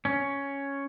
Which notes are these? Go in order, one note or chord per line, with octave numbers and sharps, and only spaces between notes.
C#4